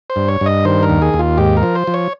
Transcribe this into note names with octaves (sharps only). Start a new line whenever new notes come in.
C5
G2
C#5
G2
D#5
D#3 C5
A#4
D#2
G#4
D#2
F4
G#2 G4
A#4
F3
C5
F3
C#5